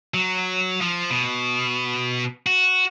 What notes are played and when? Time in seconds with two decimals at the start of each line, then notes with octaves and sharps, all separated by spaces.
0.14 F#3
0.81 F3
1.10 B2
2.46 F#4